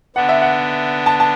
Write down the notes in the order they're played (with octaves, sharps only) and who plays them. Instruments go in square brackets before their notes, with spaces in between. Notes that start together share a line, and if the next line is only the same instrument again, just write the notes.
[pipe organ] D3 B3 D4 [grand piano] F#5
[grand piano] E5
F#5
A5
A5